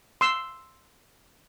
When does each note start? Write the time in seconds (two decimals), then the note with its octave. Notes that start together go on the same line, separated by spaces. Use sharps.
0.21 C6 E6